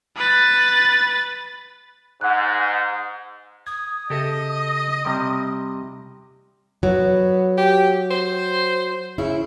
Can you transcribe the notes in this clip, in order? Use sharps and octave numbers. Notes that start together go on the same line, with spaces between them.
B4 A6
G#2 F#5 F#6
D#6 G#6
C#3 G4 A4 D#5 E5
C3 G3 G5 C6
F#3 B3
G4
C5
C#3 E4